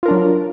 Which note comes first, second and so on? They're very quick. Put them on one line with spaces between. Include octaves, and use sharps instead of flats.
F4 A#4 D4 F#3